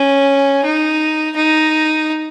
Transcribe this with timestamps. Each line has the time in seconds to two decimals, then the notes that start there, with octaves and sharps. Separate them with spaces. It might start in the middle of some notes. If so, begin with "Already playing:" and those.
Already playing: C#4
0.65 D#4
1.36 D#4